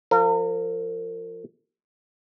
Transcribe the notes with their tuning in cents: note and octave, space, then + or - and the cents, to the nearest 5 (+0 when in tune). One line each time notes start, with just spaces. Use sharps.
F3 +0 A#4 -40